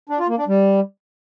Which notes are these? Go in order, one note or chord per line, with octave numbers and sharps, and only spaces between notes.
D4
F4
A#3
D4
G3